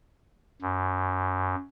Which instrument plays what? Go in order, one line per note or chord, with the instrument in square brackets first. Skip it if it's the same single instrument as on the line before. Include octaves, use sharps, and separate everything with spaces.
[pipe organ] F#2